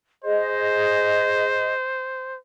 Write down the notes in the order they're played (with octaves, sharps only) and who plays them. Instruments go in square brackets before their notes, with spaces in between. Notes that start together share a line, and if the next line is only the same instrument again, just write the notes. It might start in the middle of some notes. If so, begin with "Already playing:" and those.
[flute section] G#4 D#5 [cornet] C5